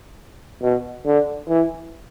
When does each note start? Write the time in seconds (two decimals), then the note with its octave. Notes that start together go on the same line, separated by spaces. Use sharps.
0.62 B2
1.06 D3
1.48 E3